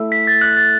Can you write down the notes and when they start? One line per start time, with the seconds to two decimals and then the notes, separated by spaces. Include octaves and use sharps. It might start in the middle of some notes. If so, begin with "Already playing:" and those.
Already playing: A3 E4 A4
0.12 B6
0.27 A6
0.41 F#6
0.57 A6